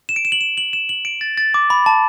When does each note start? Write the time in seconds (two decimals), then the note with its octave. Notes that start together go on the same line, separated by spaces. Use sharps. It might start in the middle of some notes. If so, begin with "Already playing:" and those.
0.09 E7
0.16 D7
0.25 E7
0.32 F#7
0.41 E7
0.58 F#7
0.73 E7
0.89 F#7
1.05 D7
1.21 A6
1.38 A6
1.54 D6
1.70 B5
1.86 A5